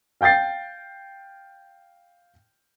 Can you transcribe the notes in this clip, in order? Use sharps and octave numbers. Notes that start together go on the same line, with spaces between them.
F5 G5 G6 A6 C7